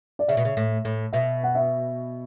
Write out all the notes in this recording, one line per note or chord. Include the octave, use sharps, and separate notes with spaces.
D5
C#3 E5
B2
C#3
A2
A2
B2 E5
F#5
E5